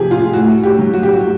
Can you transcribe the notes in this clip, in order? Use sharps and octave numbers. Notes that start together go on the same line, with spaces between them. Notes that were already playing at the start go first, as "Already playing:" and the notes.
Already playing: C3 F3 G4 G#4
F4
A2 F#4
G4
F#3
F#4
G4
F#4